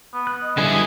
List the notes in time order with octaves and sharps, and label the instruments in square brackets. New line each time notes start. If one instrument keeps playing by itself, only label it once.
[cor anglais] B3
[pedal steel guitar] F#6
[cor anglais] D#5
[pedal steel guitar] D3 G3 E4 [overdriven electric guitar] B3 G#4